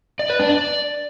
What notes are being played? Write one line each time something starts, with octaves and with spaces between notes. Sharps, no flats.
D5
B4
D4
D5